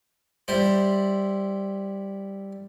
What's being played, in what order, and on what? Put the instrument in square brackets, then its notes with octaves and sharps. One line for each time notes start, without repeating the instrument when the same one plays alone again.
[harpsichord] G3 E4 C5